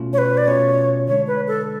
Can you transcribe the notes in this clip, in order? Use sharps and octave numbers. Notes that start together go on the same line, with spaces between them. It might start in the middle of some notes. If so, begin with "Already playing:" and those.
Already playing: B2 A3 C#4 F4
C#5
B4
D5
B2 A3 C#4 F4 C#5
D3 G#3 D4 C#5
B4
A4